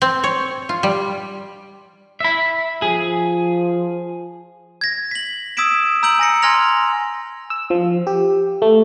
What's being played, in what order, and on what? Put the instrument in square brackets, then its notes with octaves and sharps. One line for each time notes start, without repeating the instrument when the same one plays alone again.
[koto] C4
C#5
F4
G3
[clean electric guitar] E5 B5
[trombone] F3 [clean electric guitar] G#4
[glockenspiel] G#6 A#6
B6 F#7
D#6 E6 G#6 B6 D7 E7
A#5 E6 G6 D7 F#7
G#5 A#6 C#7
G#5 C6 F6 G#6 A#6 F7
[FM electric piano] E6
F3
G4
A3